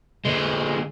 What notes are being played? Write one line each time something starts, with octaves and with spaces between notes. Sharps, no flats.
D3 G#3